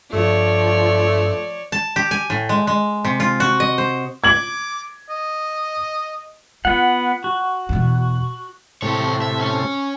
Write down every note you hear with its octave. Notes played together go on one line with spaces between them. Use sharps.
G2 F3 A3 C#5 D5
A5
G4
G#5
A2
G#3
G#3
C3
F4
F#4
D#5
C5
D6 G#6 F#7
D#5
B3 F4 F#5
F#4
E2 B2
A2 C3 G4 C#5
E5
C#4